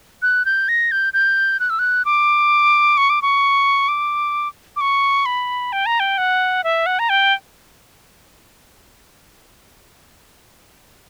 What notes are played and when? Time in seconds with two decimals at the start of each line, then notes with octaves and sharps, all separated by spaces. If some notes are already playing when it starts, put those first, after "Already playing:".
0.22 F#6
0.45 G6
0.68 A#6
0.92 G6
1.14 G6
1.60 F#6
1.70 E6
1.79 F#6
2.05 D6
2.97 C#6
3.10 D6
3.22 C#6
3.88 D6
4.76 D6
4.81 C#6
5.26 B5
5.73 G5
5.86 A#5
6.00 G5
6.18 F#5
6.64 E5
6.86 F#5
6.99 A#5
7.09 G5